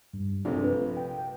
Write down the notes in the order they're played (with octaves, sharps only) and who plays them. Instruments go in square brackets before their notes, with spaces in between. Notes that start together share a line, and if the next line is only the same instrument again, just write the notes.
[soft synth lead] G2
[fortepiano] A#1 C3 A3 [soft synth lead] D4
[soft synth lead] B4
G5